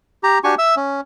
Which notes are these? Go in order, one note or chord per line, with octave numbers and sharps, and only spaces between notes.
G4 A#5
D4 F#4 G4 G#5 C#6
E5 E6
C#4